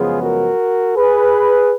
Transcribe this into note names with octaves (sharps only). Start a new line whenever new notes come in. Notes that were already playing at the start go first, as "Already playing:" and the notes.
Already playing: F#2 C#3 F3 G#3 B3 F4 G#4
F#4 A#4
G#4 B4